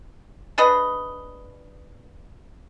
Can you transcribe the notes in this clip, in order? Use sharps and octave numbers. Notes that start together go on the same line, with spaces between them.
D4 G#4 B4 D#5